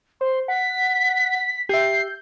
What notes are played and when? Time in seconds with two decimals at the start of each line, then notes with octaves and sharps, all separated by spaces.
0.21 C5 C6
0.48 F#5 B6
1.69 G4 E5 G6 C7